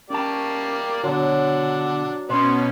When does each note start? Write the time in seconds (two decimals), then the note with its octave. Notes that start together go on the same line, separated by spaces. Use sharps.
0.10 A#3 C#4 G4 D5 A5
1.03 B2 D3 F#3 D4 F#5
2.29 B2 B3 C#4 C5